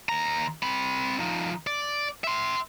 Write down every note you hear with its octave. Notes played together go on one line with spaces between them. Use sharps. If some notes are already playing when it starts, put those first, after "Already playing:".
D#2 A#5
C4 B5
F3 D#4
D5
E5 C6